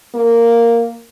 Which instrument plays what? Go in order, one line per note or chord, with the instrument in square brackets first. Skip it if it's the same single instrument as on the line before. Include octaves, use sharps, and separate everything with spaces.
[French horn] A#3